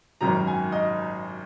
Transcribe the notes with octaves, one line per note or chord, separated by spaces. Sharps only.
G#1 F#2 D#3 F#3 A#5
G#5
D#5